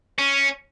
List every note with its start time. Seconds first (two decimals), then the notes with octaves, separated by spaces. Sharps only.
0.19 C#4